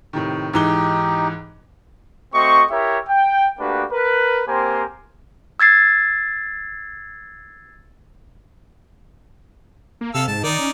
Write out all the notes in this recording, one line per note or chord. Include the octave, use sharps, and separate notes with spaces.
A2 C3 D#3
G#2 E3 D#4 G4 G7
A3 C4 F#4 D#5 C#6
E4 G4 A#4 C#5 E5
G5
A3 A#3 D4 F#4 G4 B4
A#4 B4
A#3 C4 G4 A#4 C5 G#5
E6 G#6 A6 C7
A#3
C3 A4 F5 E6
G#2 A5
D#3 D#4 D5
C#4